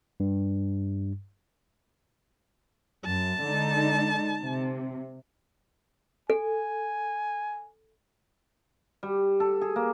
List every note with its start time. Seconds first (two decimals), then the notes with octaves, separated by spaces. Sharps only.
0.20 G2
3.05 F#2 A5
3.45 D3 G#3 D#4
4.40 C3
6.30 A4 G#5
9.03 G3
9.40 A4
9.61 G#4
9.76 A#3